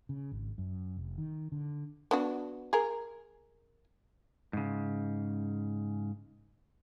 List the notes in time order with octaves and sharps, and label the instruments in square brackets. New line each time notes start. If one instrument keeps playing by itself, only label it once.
[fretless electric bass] C#3
G#1
F#2
F1
D#3
D3
[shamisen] B3 D4 F#4
G#4 A#4
[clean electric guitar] G#2 C#3